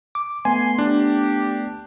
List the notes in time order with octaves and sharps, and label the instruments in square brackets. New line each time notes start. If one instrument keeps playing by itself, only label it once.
[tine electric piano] D6
[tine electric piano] A3 B3 [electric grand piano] G#5 [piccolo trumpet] C6
[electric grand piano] D4 [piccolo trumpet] G4